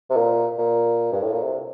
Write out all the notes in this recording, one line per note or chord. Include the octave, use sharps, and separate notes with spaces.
C3
A#2
A#2
G2
A2
A#2
C3